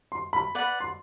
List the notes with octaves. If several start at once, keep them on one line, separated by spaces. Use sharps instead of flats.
C6
B5
B4 D5 F#5
C6